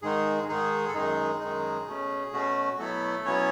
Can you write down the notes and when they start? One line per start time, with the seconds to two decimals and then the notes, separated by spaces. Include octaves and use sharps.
0.02 G#2 D#3 G#3 D#4 G#4
0.48 G#2 D#3 G#3 D#4 G#4
0.88 A4
0.94 F#2 D#3 G#3 D#4 G#4
1.40 F#2 D#3 G#3 D#4
1.86 B2 A3 C#4
2.33 B2 A3 C#4 F#4
2.79 B2 F#3 A3 B3 E4 A4
3.25 B2 F#3 B3 C#4 E4 C#5